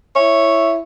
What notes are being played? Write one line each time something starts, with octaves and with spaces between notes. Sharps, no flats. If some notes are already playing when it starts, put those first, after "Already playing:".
E4 C#5 E5